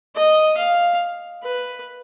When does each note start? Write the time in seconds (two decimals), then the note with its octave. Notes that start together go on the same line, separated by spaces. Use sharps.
0.15 D#5
0.58 F5
1.43 B4